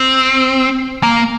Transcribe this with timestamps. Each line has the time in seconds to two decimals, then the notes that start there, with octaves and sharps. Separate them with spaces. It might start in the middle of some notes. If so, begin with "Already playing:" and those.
Already playing: C4
1.03 A#3